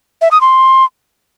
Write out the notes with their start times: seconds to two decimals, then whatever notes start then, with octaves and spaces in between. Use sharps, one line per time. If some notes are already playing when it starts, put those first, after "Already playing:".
0.21 E5
0.31 D#6
0.41 C6